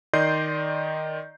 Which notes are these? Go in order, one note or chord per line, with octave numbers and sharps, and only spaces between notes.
D#3 D5 D#5 C6 G6 C7